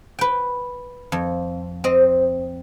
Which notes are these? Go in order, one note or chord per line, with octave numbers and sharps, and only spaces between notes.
B4 G5
F2
C4 D#5